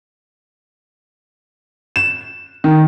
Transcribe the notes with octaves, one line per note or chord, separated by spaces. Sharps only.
E7
D#3